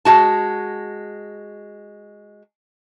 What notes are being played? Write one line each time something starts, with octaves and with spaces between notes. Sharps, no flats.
G#3 F#4 A5